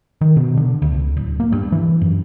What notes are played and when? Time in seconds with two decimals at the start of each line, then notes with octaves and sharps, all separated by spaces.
0.21 D#3
0.36 B2
0.57 D3
0.82 D2
0.94 C#2
1.17 D1
1.40 A#3
1.52 G2
1.72 E3
2.02 F#2